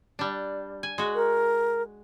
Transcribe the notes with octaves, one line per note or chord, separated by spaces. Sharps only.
G3 D4
G#5
G#3 F#4
A#4